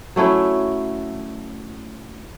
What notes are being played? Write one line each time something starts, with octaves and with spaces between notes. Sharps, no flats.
F#3 A3 C#4 E4